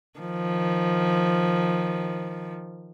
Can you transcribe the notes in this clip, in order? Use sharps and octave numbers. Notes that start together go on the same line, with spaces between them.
D#3 F3